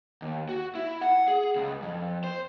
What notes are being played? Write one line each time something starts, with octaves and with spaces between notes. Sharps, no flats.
D#2
F#4
E4
F#5
G#4
C#2
F2
C5